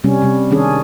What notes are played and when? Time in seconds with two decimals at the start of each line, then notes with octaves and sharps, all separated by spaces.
0.04 C3 G3 C#4
0.22 C3 G3
0.51 D#3 C#4 D4 G#4